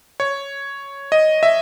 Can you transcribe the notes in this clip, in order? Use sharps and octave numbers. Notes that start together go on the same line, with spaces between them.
C#5
D#5
E5